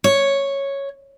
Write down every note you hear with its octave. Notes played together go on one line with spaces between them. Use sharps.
C#5